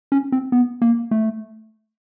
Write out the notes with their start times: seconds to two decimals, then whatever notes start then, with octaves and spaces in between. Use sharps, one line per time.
0.12 C#4
0.32 C4
0.52 B3
0.82 A#3
1.11 A3